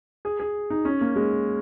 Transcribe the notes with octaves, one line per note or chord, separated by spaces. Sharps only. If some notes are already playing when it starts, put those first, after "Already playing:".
G#4
G#4
D#4
C#4
A#3
G#3